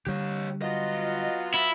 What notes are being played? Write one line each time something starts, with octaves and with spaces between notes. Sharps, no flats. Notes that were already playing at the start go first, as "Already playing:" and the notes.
D3 G3 G4 C#5
F#3 B3 F4 D#5
E4